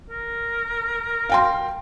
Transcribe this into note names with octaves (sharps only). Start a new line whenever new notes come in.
A#4
F5 G5 C6